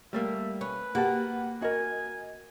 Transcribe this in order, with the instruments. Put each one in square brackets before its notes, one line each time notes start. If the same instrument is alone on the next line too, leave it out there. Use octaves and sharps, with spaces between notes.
[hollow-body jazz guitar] G3 A3 A#3 [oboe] E5
[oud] C#4 [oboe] B4
[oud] A#3 [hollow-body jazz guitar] F#4 A5 [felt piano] G4 F#5
[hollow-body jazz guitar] F#4 A#4 [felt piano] D#5 [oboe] G#5